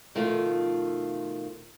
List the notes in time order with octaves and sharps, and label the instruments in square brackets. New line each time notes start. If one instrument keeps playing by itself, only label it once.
[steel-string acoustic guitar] B2 D#3 F3 A3 F4